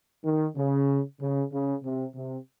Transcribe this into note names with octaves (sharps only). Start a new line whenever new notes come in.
D#3
C#3
C#3
C#3
C3
C3